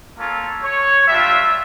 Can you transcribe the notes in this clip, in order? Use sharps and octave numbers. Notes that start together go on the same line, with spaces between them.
A#3 C#4 F4 A4
C#5
G3 D4 F4 E5